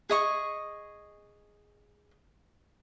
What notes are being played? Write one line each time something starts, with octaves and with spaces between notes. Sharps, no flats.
G#4 D#5 C#6